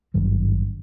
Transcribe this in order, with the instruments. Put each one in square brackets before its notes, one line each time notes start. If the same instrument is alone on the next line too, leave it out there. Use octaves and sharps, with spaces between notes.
[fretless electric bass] G#1 G2 D#3 F#3